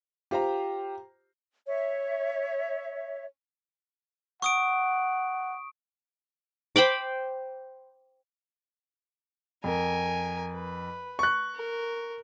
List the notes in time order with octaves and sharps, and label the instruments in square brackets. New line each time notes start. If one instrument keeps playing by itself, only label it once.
[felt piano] F4 C5 A#5 [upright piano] G4
[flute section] C#5 E5
[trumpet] F#5 [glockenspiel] C#6 D#6 D7
[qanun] C5 G5 B5 D6
[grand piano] F2 [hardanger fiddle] A#4 G#5
[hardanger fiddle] B4
[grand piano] C#6 F#6
[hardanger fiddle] A#4